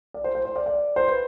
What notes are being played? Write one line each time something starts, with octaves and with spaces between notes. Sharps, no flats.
D5
C5
C5
C5
D5
D5
C5
B4